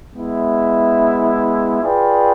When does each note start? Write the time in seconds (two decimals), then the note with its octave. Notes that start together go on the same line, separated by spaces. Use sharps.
0.15 G#3 B3 E4
1.81 F4 G#4 B4 D5 G5